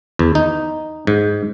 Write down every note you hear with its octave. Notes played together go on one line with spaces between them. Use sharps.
E2
D#4
G#2